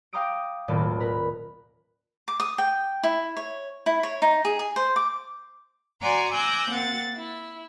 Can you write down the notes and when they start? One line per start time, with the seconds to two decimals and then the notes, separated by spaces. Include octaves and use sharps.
0.13 F5 G5 A#5 D6 D#6 D7
0.68 D#1 B1 A2 C#4 D5 A5
1.00 A#4 B4 A#5 B5
2.28 D6
2.40 D#6
2.58 G5
3.03 E4
3.37 C#5
3.86 E4
4.03 C#5
4.22 D#4
4.45 G#4
4.59 G#4
4.76 C5
4.96 D6
6.02 F#4 D5 F#5 G#5 A#5 C6
6.32 G#5 D6 E6 F#6 G6 A#6
6.69 A#3 C4 F#5 A6
7.15 E4